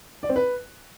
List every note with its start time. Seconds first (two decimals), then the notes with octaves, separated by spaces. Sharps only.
0.23 D5
0.29 C4
0.36 B4